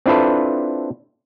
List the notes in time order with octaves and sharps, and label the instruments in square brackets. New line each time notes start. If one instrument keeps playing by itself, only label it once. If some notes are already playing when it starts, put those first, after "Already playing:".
[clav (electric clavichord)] C4 D4 E4 F4 A4 B4